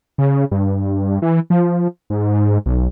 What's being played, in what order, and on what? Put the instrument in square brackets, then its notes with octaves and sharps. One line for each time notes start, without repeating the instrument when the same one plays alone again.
[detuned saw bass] C#3
G2
E3
F3
G#2
B1